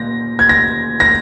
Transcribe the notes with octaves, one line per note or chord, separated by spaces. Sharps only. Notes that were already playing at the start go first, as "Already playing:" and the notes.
Already playing: A#2 A#6
G#6
A#6
A#6